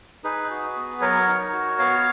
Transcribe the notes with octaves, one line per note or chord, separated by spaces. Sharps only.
D#4 G#4 B4
F#4
B3
F#3 A#4 C#5
D#4
F#4
B3 C#5 F5